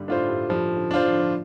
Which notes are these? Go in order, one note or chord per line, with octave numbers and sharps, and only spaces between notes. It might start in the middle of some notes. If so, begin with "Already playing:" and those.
Already playing: G2 D3 G3
A2 A3 D4 F4 C5
G2 G3
G2 F3 G3
D3
D4 F4 C5
F3
D3
F3